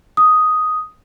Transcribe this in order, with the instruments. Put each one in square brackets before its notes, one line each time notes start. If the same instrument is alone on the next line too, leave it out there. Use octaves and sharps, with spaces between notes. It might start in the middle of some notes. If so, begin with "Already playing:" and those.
[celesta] D#6